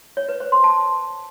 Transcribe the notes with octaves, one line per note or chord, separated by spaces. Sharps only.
C#5
B4
C5
C6
A5